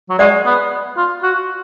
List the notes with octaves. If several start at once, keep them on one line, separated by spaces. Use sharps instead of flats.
F#3
G#3 D5 F#5
B3
F4
F#4